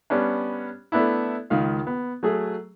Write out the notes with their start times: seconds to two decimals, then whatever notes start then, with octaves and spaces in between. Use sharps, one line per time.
0.10 G3 B3 C#4 D4
0.92 A3 B3 D4 E4
1.50 C#2 D#3 F5
1.87 B3
2.23 F#3 A3 G#4